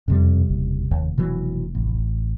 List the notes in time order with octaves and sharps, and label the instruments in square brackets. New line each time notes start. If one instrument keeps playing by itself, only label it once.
[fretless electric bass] E1 C3 G3 [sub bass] F2
[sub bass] F#1
[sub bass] F1 [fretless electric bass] D#2
[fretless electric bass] B2 E3 F#3
A1